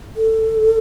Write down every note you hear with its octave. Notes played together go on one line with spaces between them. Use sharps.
A4